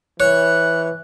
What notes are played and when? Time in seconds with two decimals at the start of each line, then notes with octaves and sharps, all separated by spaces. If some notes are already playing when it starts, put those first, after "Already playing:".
0.20 E3 C#5 F#6